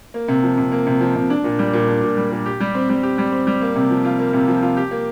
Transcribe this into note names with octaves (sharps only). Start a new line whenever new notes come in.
A#3
C3
F3
C3
A#3
C3
F3
C3
D4
A#2
G3
A#2
D4
A#2
G3
A#2
G4
G3
C4
G3
G4
G3
C4
G3
A#3
C3
F3
F4
A#3
C3
F3
F4
G4
A#3